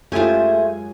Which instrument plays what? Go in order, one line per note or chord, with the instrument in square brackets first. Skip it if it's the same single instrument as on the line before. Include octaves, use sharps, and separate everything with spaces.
[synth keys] F#2 G#3 G#5 [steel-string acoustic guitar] A3 C5 [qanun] F4 G4